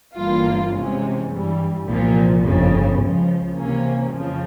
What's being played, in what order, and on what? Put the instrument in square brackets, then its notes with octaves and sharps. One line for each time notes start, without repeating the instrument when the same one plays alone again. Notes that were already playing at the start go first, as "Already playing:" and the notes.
[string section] G1 G2 E3 A#3 F4
C3 E3 G#3 C#4
G2 E3 G3
C2 A#2 F3
G1 F2 C#3
C#2 C#3 F3
C3 E3 A#3 C#4
F2 C#3 F3